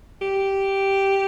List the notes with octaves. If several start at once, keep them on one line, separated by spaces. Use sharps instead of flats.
G4